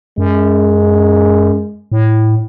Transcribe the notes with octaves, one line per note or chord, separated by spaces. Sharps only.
F#2 G#3
A2